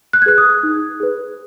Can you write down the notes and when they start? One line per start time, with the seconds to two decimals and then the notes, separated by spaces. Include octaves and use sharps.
0.13 F#6
0.22 G#6
0.26 G#4 B4 F#6
0.38 D#6
0.63 D#4
1.00 G#4 B4